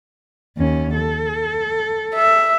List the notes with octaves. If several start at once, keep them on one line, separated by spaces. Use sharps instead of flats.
D#2 C#4
A4
E5